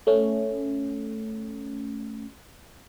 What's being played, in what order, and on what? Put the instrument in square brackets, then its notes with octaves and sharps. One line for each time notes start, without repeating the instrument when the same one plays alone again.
[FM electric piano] A3 C#4